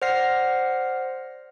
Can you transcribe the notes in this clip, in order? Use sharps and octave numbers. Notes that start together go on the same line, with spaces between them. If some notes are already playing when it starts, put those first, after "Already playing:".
C5 D5 F#5 F6 A#6 C7